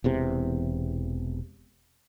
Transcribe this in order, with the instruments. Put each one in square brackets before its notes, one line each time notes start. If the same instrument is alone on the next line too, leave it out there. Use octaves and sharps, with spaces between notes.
[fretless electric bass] E1 E2 C3